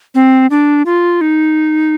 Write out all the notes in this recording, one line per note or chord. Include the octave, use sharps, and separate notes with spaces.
C4
D4
F4
D#4